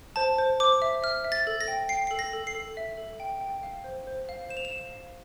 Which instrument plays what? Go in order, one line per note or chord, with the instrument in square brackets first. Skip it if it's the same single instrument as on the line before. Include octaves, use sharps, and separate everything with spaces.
[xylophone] C5 A5
C5
C5 D6
E5
E5 F6
E5
A6
A4
A#6
G5
G5 C7
A4 C7
A#6
A4
C7
A4
E5
A4
G5
G5
F5
C5
C5
F5
C5 E7
F7
E7
F5
F5